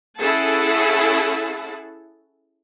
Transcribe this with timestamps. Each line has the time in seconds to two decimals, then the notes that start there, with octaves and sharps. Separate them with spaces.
0.18 C#4 E4 G#4 A4 F#5 A5